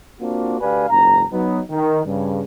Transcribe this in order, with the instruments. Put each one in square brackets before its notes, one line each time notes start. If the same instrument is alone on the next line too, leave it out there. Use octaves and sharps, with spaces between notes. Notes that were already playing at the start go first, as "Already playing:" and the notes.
[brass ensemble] A#3 C4 D4 F4 F#4
D2 G4 B4 D5 F5 G#5
F#1 C#2 G#2 A#5
F#3 B3 D#4
D#3
G2 C#3